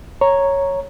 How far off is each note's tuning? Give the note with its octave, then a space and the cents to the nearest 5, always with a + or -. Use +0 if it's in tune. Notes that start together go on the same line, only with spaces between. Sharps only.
C#5 -5 A#5 +0